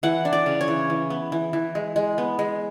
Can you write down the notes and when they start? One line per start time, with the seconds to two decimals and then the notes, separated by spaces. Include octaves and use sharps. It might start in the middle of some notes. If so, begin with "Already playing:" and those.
0.03 E3 F#5
0.25 D4
0.33 D5
0.46 C#3
0.61 C#5
0.68 E3
0.90 E3
1.10 B3
1.32 E3
1.53 E3
1.75 G#3
1.96 G#3
2.18 B3
2.39 G#3